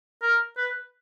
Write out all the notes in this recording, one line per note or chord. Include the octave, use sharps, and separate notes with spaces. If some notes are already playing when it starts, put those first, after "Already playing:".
A#4
B4